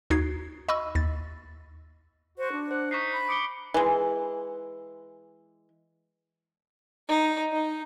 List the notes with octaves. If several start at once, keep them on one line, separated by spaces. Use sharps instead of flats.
D#2 D#4 F#4 G#6 C7
D#5 B5 C#6 E6
D#2 A6
F#4 C5
D4
C5 F#5
D#4 C#6 B6 C7
B5
D6 D#6 C#7 G7
E3 G#3
D#4
D#4